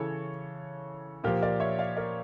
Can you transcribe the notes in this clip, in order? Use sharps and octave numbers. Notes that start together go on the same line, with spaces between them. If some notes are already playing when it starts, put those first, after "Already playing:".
Already playing: C#3 E3 A4 C#5
A#2 F3 G4 A#4
A#4 D5
C#5 E5
D5 F5
A#4 D5